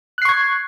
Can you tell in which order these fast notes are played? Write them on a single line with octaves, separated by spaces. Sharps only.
F#6 C7 C#6 G#6